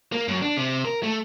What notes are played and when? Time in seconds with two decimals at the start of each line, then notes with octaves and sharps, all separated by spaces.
0.12 A#3
0.28 F#2
0.42 D4
0.57 C3
0.85 A#4
1.03 A3